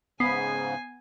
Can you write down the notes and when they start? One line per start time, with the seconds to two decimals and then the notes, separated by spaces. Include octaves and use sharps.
0.20 G#2 C#3 B3 G#5 C7